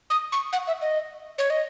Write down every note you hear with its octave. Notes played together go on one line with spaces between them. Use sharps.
D#6
C#6
F#5
E5
D#5
C#5
D#5